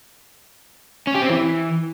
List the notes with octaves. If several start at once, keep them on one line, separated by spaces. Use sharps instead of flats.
C#4
G4
C4
E3